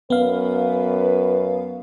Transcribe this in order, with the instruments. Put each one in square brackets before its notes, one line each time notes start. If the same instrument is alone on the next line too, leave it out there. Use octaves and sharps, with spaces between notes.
[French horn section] F#2 B4 [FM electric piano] B3 F5